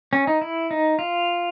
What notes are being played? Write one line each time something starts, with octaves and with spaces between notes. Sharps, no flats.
C#4
D#4
E4
D#4
F4